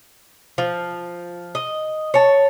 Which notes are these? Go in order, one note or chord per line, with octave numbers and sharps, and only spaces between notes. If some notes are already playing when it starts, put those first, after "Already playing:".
F3
D#5
C#5 A5